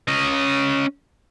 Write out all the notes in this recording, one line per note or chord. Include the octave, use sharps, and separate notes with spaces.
C#4 D#5